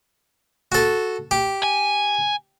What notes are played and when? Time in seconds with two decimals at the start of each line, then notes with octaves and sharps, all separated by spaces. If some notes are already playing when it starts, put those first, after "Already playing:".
0.72 F#4 A4
1.31 G4
1.63 G#5